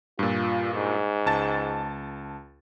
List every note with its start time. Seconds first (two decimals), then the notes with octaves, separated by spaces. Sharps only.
0.19 G2 A#2 F4
0.74 G#2
1.26 C#2 A5 A6